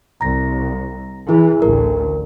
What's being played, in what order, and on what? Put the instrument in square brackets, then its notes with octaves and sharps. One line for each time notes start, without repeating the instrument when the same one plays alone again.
[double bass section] C2 [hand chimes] A#5 A#6
[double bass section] E3 [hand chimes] E4 G#4
[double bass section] A1 D2 [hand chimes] A#4